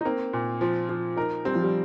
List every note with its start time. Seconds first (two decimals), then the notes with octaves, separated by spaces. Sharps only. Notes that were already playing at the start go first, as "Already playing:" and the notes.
0.01 D#4
0.05 A#3 C4
0.33 A#2
0.61 F3 F4
0.89 F3
1.16 D#4 A#4
1.45 G3 C4
1.55 F3
1.63 G3